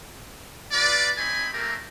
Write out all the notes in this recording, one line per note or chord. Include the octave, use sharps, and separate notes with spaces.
F4 B4 D5
C4 D#4 C#5 G#5 B5
A3 A#3 C4 G4 A#4